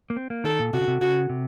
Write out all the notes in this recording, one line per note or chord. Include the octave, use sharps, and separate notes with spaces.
A#3
C4
A#3
D#3 A4
A#2
C3 F#4
C#3
C3
C#3 F#4
C3